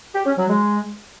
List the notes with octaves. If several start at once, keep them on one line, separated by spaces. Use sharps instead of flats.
G4
C#4
F#3
G#3